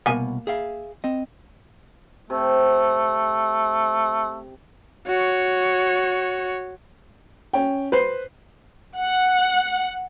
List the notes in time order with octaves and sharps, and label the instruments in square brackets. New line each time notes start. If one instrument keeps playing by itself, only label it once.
[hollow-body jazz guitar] C2 B2 [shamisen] A#3 G#5
[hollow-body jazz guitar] G#4 E5 F5
C4 D#5
[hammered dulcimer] C3 [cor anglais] A3
[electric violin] F#4 C#5
[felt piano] C#4 G5
B4 C5 C7
[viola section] F#5